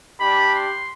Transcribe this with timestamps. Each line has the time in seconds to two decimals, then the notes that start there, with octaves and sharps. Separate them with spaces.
0.19 G3 D4 G4 B5
0.53 C6